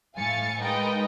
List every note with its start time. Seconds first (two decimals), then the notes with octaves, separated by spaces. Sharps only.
0.17 A2 F5 G#5 A6 C#7
0.60 G#3 D#4 A#4 B4 D#5 G5